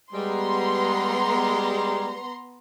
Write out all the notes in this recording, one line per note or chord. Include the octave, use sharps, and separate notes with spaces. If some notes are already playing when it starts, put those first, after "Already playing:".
G3 G#3 B3 A#5 C6